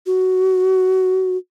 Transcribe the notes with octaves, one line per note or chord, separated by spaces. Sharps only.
F#4